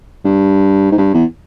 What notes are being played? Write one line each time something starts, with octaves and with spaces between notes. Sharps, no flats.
G2
G#2
G2
E2